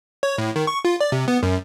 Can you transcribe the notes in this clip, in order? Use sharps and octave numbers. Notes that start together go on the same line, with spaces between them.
C#5
A2
D#3
C#6
F4
D5
C3
B3
F#2